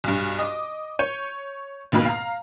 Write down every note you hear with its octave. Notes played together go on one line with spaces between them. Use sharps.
B1 G2
D#5 D6
C#5 G6 C#7 D#7
F1 B2 D#3 A#3 B4
F5 A#5